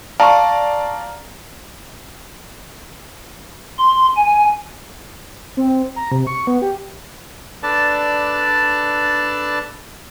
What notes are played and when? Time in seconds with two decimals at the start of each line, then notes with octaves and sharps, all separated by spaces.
0.20 D5 F5 A5 A#5 C#6
3.79 C6
4.17 G#5
5.57 C4
5.96 A#5
6.12 C3
6.27 C#6
6.47 B3
6.62 G4
7.63 D4 A4 B4 D5 A5